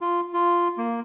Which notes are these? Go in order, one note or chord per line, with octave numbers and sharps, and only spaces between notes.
F4
F4
A#3